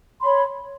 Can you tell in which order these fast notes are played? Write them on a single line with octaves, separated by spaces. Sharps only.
C6 B5 C#5